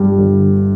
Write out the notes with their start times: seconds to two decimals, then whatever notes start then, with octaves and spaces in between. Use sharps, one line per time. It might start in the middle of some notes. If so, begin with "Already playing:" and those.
Already playing: G1 G2 G3
0.18 G1